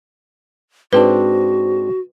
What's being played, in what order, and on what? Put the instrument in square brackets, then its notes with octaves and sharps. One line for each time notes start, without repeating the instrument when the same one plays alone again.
[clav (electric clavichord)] G#2 C4 D4 [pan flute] F#4 [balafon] B4